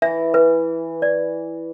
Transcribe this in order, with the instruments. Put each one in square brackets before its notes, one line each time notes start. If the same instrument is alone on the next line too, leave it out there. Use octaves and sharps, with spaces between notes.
[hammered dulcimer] E3 [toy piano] E5
[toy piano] B4
D5